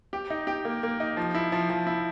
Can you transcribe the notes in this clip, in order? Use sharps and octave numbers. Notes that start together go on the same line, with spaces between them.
G4
D#4
G4
A#3
A#3
D#4
F3
E4
F3
F3
E4